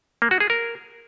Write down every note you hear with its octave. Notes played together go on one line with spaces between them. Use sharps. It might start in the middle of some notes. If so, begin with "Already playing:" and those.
A#3
F#4
G#4
A#4